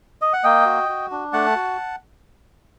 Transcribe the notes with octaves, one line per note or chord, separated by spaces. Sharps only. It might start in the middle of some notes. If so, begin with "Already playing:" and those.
D#5
F#5
A#3 D#5 G5
F#4
F#4
D4
A3 F#5 A5
F#4